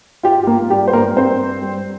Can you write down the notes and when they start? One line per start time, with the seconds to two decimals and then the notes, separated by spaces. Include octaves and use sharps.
0.23 F4 G4
0.43 G4
0.47 A#3 A#4
0.70 G2 G4
0.88 C5
0.93 A#3 A#4
1.16 G2 C4 C5
1.62 G3